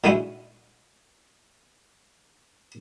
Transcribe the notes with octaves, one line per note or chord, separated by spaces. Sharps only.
A#2 D3 G#3 D#4 E4 F#4